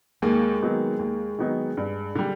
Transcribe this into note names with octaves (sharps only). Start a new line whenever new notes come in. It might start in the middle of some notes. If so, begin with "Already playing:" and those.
D#2 G#3 A#3
D#3 F#3 B3 D#4
D#2
D#3 F#3 B3 D#4
G2
D3 G3